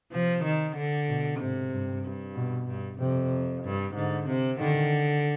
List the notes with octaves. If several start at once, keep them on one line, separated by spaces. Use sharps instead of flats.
C3 F3
D#3
D3
B2
G#2 C3
G2
G2
B2
G2
F2 C3
G2
G#2 D3
C3
D3 D#3